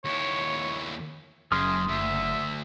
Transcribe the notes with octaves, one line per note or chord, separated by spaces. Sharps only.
D#2 E4 C#5
F#1 F#2 G#4 C6 D#6 F6
D2 E5